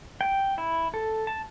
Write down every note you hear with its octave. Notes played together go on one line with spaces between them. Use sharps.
G5
E4
A4
A5